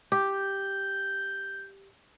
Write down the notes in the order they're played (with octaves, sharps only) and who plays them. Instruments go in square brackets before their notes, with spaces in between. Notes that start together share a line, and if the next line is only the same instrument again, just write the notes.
[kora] G4 [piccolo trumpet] G6